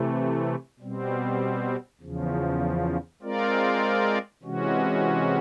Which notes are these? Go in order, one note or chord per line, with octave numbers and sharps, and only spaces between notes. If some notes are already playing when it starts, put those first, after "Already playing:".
Already playing: C3 E3 A3
B2 G3 C4
E2 C#3 F3
G#3 C4 F4 A#4 D5
C3 E3 G#3 C#4 F#4